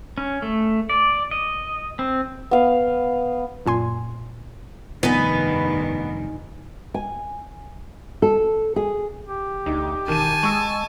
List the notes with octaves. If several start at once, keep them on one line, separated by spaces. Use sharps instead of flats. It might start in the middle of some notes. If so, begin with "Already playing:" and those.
C#4
A3
D5
D#5
C4
B3 F5
F#2 A#2 G#5 C6
F1 G2 D#3 B3 D#4 G#5
G#5
A4
G#4
G4
D2 D#4
E1 D#3 G#5 A5 D#7
G#3 C#6 E6